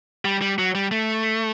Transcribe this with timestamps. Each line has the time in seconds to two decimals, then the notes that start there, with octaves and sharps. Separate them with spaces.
0.25 G3
0.41 G3
0.59 F#3
0.75 G3
0.91 A3